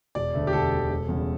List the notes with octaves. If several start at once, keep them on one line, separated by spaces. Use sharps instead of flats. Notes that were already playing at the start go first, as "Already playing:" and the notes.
E1 D5
D2 D3 A3
G4
E1 A4
D2 D3 A3
E1
E2 C#3 G3